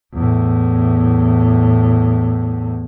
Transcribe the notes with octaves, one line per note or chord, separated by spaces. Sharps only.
E2 A2